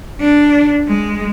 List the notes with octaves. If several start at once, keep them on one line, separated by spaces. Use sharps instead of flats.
D4
G#3